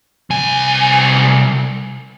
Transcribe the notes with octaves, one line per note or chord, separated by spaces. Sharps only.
C2 G#5